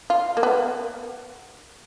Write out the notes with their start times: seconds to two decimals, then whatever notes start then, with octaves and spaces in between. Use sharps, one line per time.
0.10 F4
0.37 A#3
0.43 B3